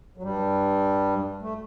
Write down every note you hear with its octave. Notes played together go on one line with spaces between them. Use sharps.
F#3
G2 G3
A3